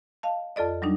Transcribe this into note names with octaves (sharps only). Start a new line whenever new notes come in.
D#5 F5 A5
F2 F4 A4 D5 D#5
F#3 G3 D4 D#4